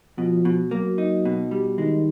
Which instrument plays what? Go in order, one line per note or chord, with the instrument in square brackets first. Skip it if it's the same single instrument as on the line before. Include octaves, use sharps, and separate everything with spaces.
[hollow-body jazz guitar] B2 [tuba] F3
[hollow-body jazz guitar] B2
[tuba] F#3 [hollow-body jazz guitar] A#3
[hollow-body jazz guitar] D#4
B2
G3
[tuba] D#3 [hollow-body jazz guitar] G#3